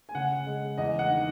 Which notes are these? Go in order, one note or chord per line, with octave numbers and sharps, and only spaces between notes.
G#5
C#3 F#5
G#3
E2 D#5
F#5
D#3